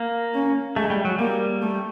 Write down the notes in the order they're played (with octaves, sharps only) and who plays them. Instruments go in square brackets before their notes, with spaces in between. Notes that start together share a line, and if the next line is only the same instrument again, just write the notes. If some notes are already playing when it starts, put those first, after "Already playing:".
Already playing: [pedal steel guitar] A#3
[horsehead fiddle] C#4
[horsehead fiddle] G#3 [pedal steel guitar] A3
[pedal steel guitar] G3
F#3
[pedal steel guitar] G3 [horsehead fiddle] A#3
[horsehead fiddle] A3